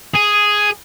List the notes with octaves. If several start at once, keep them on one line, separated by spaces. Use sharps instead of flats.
G#4